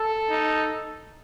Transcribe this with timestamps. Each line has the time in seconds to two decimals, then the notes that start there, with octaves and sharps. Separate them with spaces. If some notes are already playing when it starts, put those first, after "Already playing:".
Already playing: A4
0.29 D#4